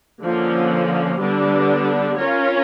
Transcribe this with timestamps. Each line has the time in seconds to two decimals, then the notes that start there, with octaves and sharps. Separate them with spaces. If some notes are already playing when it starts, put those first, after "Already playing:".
0.22 D3 F3 A#3 C#4
1.20 D3 G3 B3 D4
2.17 C#4 F4 A#4 C#5